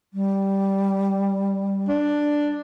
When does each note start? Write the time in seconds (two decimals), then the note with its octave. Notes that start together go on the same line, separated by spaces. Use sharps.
0.14 G3
1.88 D4